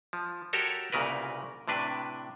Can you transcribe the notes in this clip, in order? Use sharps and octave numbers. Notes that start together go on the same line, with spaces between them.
F3
F#4 G4 A4 A#4 C#5
C2 A#2 C#3 A#4 B4
A2 C3 D4 B4